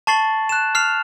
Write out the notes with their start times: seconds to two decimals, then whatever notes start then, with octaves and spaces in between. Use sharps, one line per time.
0.07 A5 C#6 A6 C7 F#7
0.49 F#6 E7
0.75 F6 C7 F7